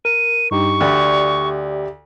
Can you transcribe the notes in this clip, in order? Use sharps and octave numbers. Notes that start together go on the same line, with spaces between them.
A#4 D#7
G2 D#4 G4 C#6
D2 G4 D5 E5